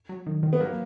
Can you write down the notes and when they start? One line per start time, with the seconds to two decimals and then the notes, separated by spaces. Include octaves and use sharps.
0.09 F#3
0.27 D#3
0.43 D#3
0.53 B3
0.60 F#3 A#3